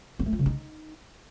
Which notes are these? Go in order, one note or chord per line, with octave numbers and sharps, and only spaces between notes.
B3
A3
F4
C#3
D#4